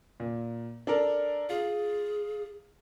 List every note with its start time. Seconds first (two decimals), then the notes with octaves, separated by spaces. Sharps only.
0.20 A#2
0.87 D4 A4 A#4
1.49 F4 G#4